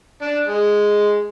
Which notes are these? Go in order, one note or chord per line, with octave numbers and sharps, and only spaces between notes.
D4
G#3